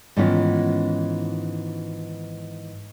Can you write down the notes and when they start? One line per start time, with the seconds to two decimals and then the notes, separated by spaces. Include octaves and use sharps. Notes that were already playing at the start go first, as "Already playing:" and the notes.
0.17 G#2 D#3 E3 B3 C#4 F4